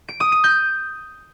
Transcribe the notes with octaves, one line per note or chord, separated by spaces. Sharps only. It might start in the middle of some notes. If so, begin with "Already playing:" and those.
D7
D#6
D#7
G6